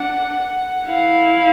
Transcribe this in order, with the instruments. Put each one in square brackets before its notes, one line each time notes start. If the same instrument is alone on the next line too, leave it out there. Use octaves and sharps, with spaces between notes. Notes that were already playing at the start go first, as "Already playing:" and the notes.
Already playing: [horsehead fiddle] D4 [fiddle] F#5
[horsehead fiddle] E4 [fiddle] F5